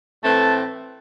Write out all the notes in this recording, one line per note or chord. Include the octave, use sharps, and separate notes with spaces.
A2 E3 A3 C4 A5